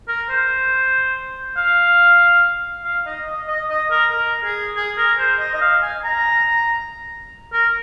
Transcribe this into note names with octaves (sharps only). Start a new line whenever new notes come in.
A#4
C5
F5
F5
D#5
D#5
D#5
D#5
A#4
A#4
G#4
G#4
A#4
C5
D#5
D#5
F5
G#5
A#5
A#4